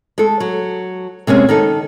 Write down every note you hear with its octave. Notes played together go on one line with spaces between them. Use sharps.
G#3 A4
F#3
C3 G#3 A#3 C#4
D#3 D#4 A4